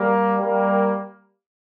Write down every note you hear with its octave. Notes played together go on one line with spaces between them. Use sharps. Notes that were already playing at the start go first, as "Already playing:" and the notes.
Already playing: G3 A#3
G3 A#3